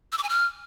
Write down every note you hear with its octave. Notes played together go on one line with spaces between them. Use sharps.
E6
D6
G#5
F6